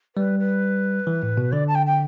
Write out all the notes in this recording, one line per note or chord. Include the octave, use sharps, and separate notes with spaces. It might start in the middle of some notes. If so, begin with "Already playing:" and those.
G3 B4
B4
E3
A2
B2
D3 D5
A5
G5
G5